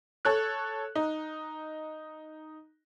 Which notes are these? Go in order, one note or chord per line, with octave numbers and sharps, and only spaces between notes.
A4 C#5 F#6
D#4